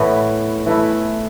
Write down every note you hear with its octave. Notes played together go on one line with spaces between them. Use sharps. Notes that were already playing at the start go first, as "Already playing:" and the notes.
Already playing: A2 E3 B3
E3 A3 E4